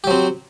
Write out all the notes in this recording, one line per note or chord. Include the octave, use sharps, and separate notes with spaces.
F#3 C4 G4